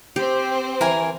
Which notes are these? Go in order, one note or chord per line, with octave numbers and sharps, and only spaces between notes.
C4 G4 C5
E3 A#4 G#5